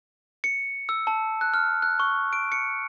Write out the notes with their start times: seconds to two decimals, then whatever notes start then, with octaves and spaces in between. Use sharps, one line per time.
0.44 C#7
0.89 E6
1.07 A5
1.41 F#6
1.54 F6
1.82 F#6
2.00 C#6
2.33 D7
2.52 C#7